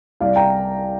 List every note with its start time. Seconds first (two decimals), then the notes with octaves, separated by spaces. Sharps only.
0.20 C2 D5 F5
0.36 G5 A#5